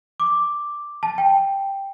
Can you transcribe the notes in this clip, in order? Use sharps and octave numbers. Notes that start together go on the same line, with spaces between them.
D6
A5
G5